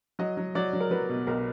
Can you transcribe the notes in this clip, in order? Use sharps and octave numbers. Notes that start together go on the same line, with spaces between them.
F#3 D#5
F#3
F#3 D5
F#3
A#4
F#3 B4
B2
B1 A#4